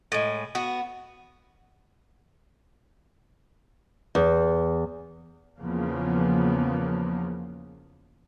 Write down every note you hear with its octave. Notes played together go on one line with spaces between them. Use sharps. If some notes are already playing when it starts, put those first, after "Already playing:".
A2 G#3
B3 F#4
E2
E2 C#3 F3 A#3 B3